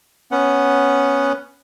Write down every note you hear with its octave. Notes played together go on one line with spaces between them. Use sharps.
B3 C#4 F#5